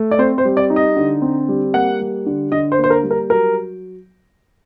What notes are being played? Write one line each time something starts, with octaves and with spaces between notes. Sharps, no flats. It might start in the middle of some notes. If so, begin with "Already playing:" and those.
Already playing: A3
D5
C4 C5
C5
G3
D5
D#4
D#5
D3
C4
G3
A#3 F#5
G3
D3
D3 D#5
C5
A#3
C5
A#4
G3
A#4
F#3 A#4